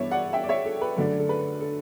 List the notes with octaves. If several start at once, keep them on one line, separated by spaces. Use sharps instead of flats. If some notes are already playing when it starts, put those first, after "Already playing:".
Already playing: G2 E3 B3 D4 C#5 D5 E5
D5 F#5
E5 G5
D5
C#5 E5
A4
B4
F#2 D3 A3 D4 A4
A4
B4
A4